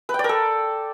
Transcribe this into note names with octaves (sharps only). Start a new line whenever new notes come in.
B4
G5
D5
A#4
A4